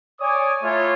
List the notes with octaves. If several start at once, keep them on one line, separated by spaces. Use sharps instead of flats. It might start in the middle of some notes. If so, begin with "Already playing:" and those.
C#5 D5 G#5 D6 D#6
A3 E4 F4 C#5